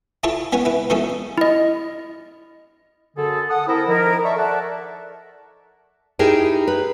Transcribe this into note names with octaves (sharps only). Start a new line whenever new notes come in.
E4 F4 A4 C#5 A5 C#6
B3 C#4 C#5 F#5
E4 B4
B2 F3 A3 C#4 A4
E4 D#5
F#2 D3 G#4 A4
A4 F#5 D#6
C4 E4 A4 A#4
D#3 F3 E4 A#4
D5 E5 A5 C#6
A4 D5 E5 F#5 A5
D#4 E4 G4 G#4 A#4 G5
B4